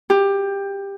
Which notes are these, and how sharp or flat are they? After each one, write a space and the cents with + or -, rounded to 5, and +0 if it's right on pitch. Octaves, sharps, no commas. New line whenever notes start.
G4 +15